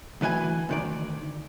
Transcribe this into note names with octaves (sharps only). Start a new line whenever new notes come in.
D2 E3 B4 D#5 G#5
D2 D#3 D5